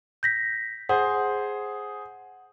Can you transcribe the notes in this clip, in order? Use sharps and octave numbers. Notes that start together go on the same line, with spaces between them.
G6 A#6 B6
G#4 C5 F#5